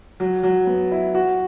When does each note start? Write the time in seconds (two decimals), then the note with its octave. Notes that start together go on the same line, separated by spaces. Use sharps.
0.20 F#3
0.43 F#3
0.67 B3
0.92 E4
1.14 F#4